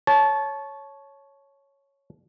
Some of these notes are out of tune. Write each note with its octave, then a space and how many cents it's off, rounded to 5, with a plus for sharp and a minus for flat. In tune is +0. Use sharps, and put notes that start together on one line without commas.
C#5 +0 A5 -20